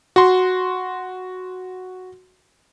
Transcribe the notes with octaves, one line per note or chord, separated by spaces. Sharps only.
F#4 C6